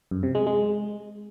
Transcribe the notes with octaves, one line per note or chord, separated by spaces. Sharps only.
F#2
C3
G#3
G#3